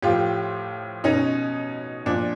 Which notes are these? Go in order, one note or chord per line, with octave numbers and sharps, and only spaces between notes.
A2 F3 F4 G4
B2 C#4 D#4
A#2 F3 D4